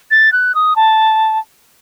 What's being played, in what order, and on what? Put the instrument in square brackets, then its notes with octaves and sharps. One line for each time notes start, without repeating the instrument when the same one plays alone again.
[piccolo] A6
F#6
D#6
A5